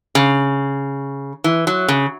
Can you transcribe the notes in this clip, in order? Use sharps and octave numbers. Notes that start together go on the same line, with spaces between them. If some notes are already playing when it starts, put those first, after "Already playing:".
C#3
E3
F#3
C#3